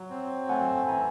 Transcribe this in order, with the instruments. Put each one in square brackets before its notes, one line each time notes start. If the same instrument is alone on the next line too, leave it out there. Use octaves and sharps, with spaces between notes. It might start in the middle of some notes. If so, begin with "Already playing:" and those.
Already playing: [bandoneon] F#3
C4
[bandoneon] A3 [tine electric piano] F#5 G#5
[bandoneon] E3 [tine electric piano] G#5 A#5